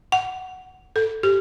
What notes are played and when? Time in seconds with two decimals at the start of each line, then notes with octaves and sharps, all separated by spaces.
0.12 F#5
0.96 A4
1.23 G4